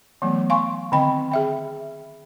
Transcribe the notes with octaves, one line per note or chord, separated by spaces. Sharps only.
E3 F#3 A3 B3
F5 G#5 C6 C#6
D3 D#3 C4 D#5 G5 B5
G#4 E5 G5